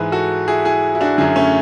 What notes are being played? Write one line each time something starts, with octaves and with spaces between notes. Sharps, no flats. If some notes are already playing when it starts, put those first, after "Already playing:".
Already playing: G#2 E3 G#4 B4
F#4 A4
E4 G#4
E4 G#4
E4
D4 F#4
F#2 D3 E4 G#4
A3 C#4